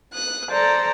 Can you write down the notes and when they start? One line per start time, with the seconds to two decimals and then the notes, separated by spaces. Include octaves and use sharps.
0.13 D#6 F#6
0.49 A4 C5 D5 A#5